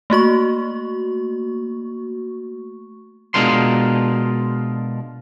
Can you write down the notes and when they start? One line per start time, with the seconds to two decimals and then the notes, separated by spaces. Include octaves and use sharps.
0.10 A3 A#3 F#4 C#6
3.34 B2 G#3 D4 F4 A#4 C6